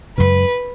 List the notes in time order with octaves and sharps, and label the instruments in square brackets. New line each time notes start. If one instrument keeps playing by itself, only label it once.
[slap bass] F#2 C#3 G#3 [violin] B4